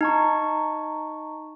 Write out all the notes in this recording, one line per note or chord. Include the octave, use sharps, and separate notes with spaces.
D#4 A5 C#6